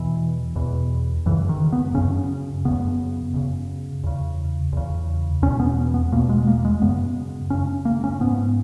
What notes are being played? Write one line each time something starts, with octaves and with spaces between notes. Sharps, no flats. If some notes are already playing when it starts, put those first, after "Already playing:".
Already playing: E2 B2 E3
E2 B2
F#2 C#3 E3
D#3
B3
F#2 C#3 C#4
F#2 C#3 B3
F#2 C#3
E2 C#3
E2 C#3
E2 B2 C#4
B3
B3
E2 B2 A#3
G#3
A#3
G#3
F#2 C#3 B3
F#2 C#3 C#4
A#3
C#4
G#2 B3